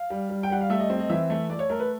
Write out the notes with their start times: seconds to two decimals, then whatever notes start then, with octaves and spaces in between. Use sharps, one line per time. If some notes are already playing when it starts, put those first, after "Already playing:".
Already playing: F5
0.10 G3
0.30 G3
0.43 G5
0.50 G3 F#5
0.61 F5
0.70 A3 E5
0.80 D#5
0.90 C4
0.99 D#5
1.09 E3 E5
1.30 A3
1.49 A3 D5
1.59 C#5
1.69 A3 A#4
1.80 B4